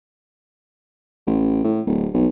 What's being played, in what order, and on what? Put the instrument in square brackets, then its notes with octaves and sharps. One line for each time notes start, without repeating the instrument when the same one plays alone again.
[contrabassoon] A1
A2
D1
B1